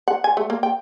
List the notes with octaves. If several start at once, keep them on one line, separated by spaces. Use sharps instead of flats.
F#5
G#5
A3
A#3
G5